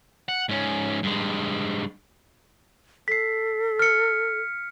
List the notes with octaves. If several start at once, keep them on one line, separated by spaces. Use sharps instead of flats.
F#5
G#2 C#4
G2 G#3
A4 B6 C7
F6 C#7